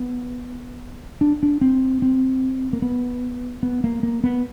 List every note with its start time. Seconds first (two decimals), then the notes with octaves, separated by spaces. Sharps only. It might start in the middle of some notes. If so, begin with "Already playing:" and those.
Already playing: B3
1.21 D4
1.43 D4
1.61 C4
2.02 C4
2.73 A#3
2.82 B3
3.63 B3
3.84 A#3
4.03 A#3
4.24 B3